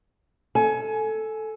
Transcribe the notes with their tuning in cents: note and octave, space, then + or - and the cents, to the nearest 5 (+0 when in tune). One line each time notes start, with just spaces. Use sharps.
A4 +0 G#5 +20